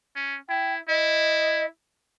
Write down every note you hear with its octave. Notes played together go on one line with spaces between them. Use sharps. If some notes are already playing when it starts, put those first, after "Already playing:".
C#4
E4 G5
E4 D#5